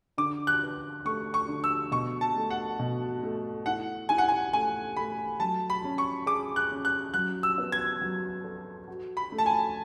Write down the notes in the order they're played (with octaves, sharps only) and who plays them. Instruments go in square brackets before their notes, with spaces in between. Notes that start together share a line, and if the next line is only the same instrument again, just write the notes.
[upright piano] D3 [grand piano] D6
[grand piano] F#6
[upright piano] B4
[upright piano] A3 [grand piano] C#6
[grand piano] C#6
[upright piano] D3
[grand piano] E6
[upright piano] B2 [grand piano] C#6
[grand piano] A5
[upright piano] A3
[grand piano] F#5
[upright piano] B2
A3
[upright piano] E4 [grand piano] F#5
[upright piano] E4 [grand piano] G#5
[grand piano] F#5
G#5
[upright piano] A3 [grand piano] G#5
[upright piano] A3 [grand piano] B5
[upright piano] F#3 [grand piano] A5
[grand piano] B5
[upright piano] C#4
[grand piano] C#6
[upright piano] G#4 [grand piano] D6
[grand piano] F#6
[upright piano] C#4
[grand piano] F#6
[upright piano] F#3 [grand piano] F#6
[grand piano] E6
[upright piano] B3
[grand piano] G#6
[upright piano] F#3
A4
F#4
[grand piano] B5
[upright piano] A3
[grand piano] A5
G#5